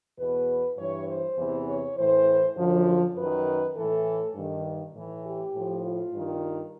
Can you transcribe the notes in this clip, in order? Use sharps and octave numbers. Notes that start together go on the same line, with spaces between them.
E2 B2 B4
G2 E3 C#5
C5
E2 C3 E3
C#5
A2 E3 C5
F#2 D3 F3
F#2 B4
D#3
A2 E3 A4
G2 D#3
A2 E3
G4
A2 F3
F4
G2 D#3